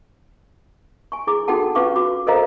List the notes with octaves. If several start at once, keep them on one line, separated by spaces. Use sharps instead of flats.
G#5 C#6
E4 G#4 D6
D#4 F#4 A4 F#5 G5 A5
C#4 F4 B4 F5 C#6 D6
F#4 D6
A4 A#4 C5 D#5 F5 A#5